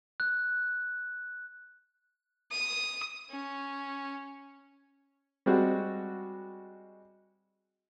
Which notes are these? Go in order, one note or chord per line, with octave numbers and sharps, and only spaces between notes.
F#6
D#6
C#4
G3 G#3 C4 F#4